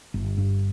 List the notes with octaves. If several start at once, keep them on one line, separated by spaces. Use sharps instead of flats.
G1
G2